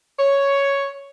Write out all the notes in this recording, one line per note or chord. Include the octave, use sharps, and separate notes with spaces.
C#5